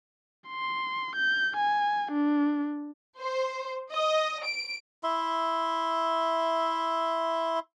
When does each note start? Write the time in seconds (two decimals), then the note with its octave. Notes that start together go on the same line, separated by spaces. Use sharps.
0.48 C6
1.16 G6
1.57 G#5
2.12 D4
3.20 C5
3.93 D#5
4.44 D7
5.04 E4 E5 C6